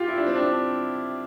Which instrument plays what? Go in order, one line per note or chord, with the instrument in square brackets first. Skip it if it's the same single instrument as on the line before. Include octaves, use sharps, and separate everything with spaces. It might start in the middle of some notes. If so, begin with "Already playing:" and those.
Already playing: [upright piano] F4 G4
E4
D4
C4
D4